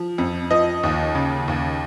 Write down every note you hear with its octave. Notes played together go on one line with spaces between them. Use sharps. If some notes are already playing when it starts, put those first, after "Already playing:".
Already playing: F3
F2
F3 D#5
D#2
C#3
D#2